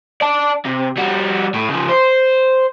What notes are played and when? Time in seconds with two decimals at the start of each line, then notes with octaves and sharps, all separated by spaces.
0.21 D5 A5
0.65 C3
0.97 G3 F#4
1.54 A2
1.69 C#3 F3
1.89 C5